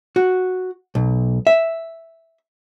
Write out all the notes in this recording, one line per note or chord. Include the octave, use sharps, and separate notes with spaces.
F#4
B1
E5